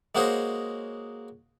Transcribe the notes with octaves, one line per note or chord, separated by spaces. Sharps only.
G#3 A#3 F#4 C5 C#5 D#5